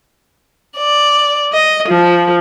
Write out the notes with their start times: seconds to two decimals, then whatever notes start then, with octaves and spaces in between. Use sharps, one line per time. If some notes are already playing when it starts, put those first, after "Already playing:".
0.78 D5
1.53 D#5
1.88 F3